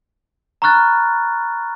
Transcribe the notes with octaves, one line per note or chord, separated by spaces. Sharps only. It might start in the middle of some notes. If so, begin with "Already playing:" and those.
A#5 B5 C#6 F6 F#6 A6